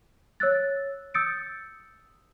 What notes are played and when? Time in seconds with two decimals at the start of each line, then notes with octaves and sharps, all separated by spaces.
0.40 C#5 E6 F#6 A6
1.14 D#6 E6 G6 A6 C#7 D7